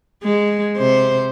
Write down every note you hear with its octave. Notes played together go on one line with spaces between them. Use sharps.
G#3
C3 C5